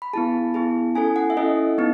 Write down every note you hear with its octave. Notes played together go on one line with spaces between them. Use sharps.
B5
B3 E4 G#4 A5
B3 E4 G#4
C#4 E4 A4 G#5
F#5
E5
C#4 E4 A4 D#5
B3 D#4